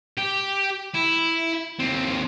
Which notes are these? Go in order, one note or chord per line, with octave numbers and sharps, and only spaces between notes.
G4
E4
D#2 C4